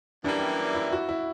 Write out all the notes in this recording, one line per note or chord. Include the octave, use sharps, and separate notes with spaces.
F#2 E3 G3 A#3 D4
E4
F#4
E4